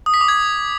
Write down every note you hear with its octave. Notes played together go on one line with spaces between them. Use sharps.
D#6
B6
D6
G#6